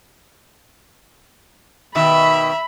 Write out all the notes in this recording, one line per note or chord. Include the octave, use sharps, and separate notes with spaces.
B2 D#3 E5 B5